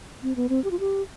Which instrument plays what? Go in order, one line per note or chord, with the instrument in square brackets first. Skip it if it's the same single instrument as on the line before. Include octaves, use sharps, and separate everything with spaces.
[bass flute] C4
B3
C4
G4
F4
G4